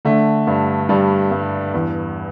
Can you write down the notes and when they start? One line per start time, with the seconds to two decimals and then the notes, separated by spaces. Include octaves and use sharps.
0.05 D3 A3
0.47 G2
0.89 G2 G3
1.32 G2
1.74 E2